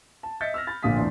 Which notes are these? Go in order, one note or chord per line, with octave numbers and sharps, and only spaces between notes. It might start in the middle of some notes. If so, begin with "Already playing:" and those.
A5
D#5 E5 G6 A6 B6 C#7
E6 F6 A#6
B5 A6
A#1 A#2 D3 F5 D#6 B6
E2 A2 D4 C6